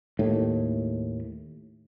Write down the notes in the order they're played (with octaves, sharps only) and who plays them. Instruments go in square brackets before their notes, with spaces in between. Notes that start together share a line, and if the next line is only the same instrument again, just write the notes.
[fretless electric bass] D#2 A2